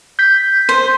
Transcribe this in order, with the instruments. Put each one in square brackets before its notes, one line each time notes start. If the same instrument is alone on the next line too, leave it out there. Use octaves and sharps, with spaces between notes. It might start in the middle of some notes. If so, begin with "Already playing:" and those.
[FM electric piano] G6 B6
[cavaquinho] C5